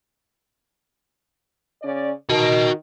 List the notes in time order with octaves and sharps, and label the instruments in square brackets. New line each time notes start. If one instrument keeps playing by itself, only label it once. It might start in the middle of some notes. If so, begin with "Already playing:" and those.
[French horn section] C#3 C#4 D5
[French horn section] D#3 [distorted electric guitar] F#4 D#5